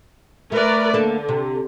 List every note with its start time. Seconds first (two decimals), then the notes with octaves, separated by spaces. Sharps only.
0.52 A3 A#4 B4 D5
0.94 D3 A#3 A4
1.29 C3